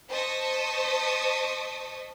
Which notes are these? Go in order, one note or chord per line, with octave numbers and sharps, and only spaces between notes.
C5 D#5 A5 C#6 D#6 B6